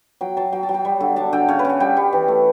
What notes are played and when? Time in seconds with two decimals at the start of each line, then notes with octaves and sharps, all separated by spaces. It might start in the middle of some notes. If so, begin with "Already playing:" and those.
0.21 F#3 G5
0.37 F#3 A5
0.52 F#3 G5
0.63 A5
0.69 F#3
0.74 G5
0.85 G3
1.01 D3
1.16 D4 A5
1.33 D3 G5
1.48 C#3 C#5
1.59 B4
1.65 C#3 F#5
1.80 G3 G5
1.97 G3
2.13 E3
2.28 A3